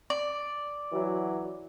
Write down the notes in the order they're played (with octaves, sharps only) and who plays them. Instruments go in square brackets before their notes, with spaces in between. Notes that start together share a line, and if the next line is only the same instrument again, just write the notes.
[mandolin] D5
[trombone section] E3 F#3